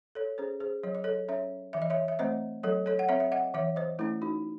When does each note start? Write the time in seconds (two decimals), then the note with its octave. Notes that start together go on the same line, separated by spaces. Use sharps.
0.15 A4 C#5
0.38 C#4 G#4 C5
0.60 G#4 C5
0.83 F#3 C#5
0.95 D#5
1.04 A4 C#5
1.28 C#4 C#5 E5
1.73 E3 E5
1.82 D#5
1.90 C#5 E5
2.08 E5
2.19 A3 C4 C5 D#5
2.63 F#3 A4 C#5
2.86 A4 C#5
2.99 F#5
3.09 C4 C#5 E5
3.20 E5
3.32 D#5 F#5
3.54 E3 C#5 E5
3.76 C5 D#5
3.99 A3 C#4 E4
4.22 D#4 F#4